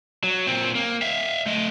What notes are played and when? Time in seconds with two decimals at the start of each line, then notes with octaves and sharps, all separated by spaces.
0.23 F#3
0.47 A#2 C4
0.75 A#3
1.02 E5 F5
1.46 A3 D#5